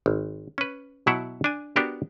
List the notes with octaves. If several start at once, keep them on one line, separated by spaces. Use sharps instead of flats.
G#1
C#4 B4
B2 F#3 E4 E5 F#5
D4 G#5
B3 D4 F#4 G4 A#4